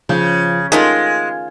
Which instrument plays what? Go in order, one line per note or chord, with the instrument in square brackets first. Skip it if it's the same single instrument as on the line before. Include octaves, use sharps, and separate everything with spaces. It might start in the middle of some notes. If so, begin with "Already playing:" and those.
[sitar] C#3 [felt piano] F3 G6
[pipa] D#3 A3 F4 [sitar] G#3 [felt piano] G#5 C6